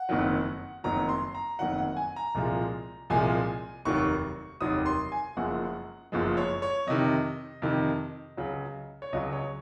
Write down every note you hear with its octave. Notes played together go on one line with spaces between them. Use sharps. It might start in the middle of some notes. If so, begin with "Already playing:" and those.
Already playing: F#5
F#1 F2 D#3 F#3
F#1 F2 D#3 F#3 A#5
C6
A#5
F#1 F2 D#3 F#3 F#5
F#5
G#5
A#5
C2 A#2 F3 G#3
C2 A#2 F3 G#3 G#5
F1 D#2 D#3 F#3 C#6
F1 D#2 D#3 F#3 D#6
C6
G#5
F#1 F#2 F3 G#3 F#5
F#1 F#2 F3 G#3
C#5
C#5
F2 C3 D#3 D#5
F2 C3 D#3
C#2 C#3 F#3
C#5
C#2 C#3 F#3 D#5
C#5